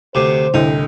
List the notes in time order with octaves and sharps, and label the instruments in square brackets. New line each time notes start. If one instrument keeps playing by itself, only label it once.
[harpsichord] D2 C3 [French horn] C5 [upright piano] D6
[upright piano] C2 A2 D3 [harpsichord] D#4